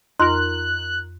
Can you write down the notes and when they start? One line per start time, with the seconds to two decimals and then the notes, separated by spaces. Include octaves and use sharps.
0.19 F2 D#4 F4 A#4 C6 F#6